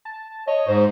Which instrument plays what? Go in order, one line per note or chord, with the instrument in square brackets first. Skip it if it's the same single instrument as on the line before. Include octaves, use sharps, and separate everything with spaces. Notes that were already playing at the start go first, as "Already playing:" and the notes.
[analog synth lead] A5
[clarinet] C#5 [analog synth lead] D#5
[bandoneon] G#2 [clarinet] C5